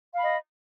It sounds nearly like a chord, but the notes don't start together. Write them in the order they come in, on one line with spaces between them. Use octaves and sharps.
F5 B5 D#5